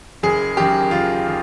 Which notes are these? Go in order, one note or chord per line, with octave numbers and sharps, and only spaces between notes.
F#1 G#4
F#2 D#3 G4
F#1 F4
D#3